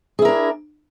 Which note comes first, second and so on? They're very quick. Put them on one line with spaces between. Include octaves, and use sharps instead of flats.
G#4 E4 A#4 D4